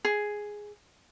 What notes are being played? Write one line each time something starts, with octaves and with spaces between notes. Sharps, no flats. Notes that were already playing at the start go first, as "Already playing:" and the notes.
G#4